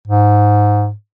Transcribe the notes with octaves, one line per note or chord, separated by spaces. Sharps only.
G#2